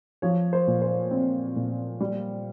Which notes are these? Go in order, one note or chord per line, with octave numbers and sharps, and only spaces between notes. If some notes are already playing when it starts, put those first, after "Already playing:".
F3 C#5
C5
A#2
C5
C4
A#2
G3